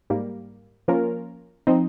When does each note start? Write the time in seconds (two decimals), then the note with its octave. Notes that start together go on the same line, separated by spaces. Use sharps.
0.10 G#2 G3 A#3
0.88 F3 A#3 C#4 F4 A#4
1.67 F3 C4 D#4